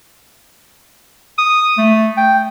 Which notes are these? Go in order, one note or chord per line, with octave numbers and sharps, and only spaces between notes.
D#6
A3
G5